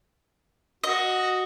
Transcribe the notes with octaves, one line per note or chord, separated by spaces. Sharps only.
F#4 D#5